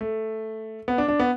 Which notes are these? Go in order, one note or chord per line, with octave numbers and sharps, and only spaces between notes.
A3
B3
D4
D4
B3